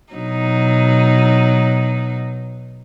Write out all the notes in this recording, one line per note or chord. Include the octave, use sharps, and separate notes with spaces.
B2 F#3 D#4